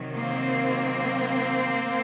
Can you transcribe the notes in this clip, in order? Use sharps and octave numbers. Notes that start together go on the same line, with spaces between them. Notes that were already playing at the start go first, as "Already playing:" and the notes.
Already playing: C3 D#3 F#3
A#3 C4